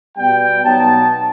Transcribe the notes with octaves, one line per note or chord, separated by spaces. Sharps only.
B2 G3 B3 G5
B2 F#3 B3 D#4 A5